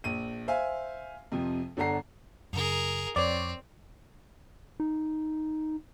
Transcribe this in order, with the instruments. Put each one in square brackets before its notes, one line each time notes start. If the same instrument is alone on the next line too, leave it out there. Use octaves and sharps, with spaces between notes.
[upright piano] A#1 D#7
C5 E5 F5 G#5
F2 C3 F3
G1 D4 A4 F#5 A#5 C7
[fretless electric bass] F#2 C#3 [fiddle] G#4 A#4
[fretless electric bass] F2 [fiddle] C4 [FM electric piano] C#5 D5
[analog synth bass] D#4